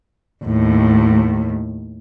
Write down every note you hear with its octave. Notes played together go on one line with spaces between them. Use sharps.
D#2 A2